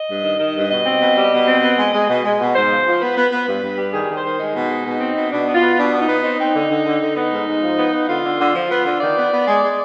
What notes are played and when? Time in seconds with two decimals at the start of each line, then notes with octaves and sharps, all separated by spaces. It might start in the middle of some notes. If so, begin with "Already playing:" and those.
Already playing: D#5
0.09 G2
0.24 D#3
0.39 D#3
0.55 G2
0.70 B2 D#5
0.86 C4
1.01 B2
1.16 G3
1.31 B2
1.47 C4
1.62 B3
1.77 G#3
1.93 G#3
2.08 B2
2.23 G#3
2.39 B2
2.55 G#2 C5
2.70 F3
2.86 F3
3.01 B3 B4
3.16 B3
3.31 B3
3.47 G2
3.62 G2
3.78 G3
3.92 D#3 G#4
4.08 D#3
4.16 C5
4.23 D#3
4.40 G#3 D#4
4.55 B2
4.70 G#3
4.85 B2
5.00 C4
5.15 B2
5.32 B2 D4
5.47 B3
5.55 F4
5.62 B3
5.78 B2 D4
5.93 B3
6.01 D#4
6.08 B3
6.23 C4 D#4
6.39 C4
6.55 D3
6.69 D3
6.86 D3
7.01 D3
7.16 B3 D#4
7.31 G#2
7.47 G#2
7.62 F3
7.78 B3
7.93 B3
8.08 D3 F4
8.24 D3
8.40 D3
8.54 F3
8.70 B3
8.86 D3
9.00 D#3 D5
9.16 B3
9.31 B3
9.47 G#3
9.62 G#3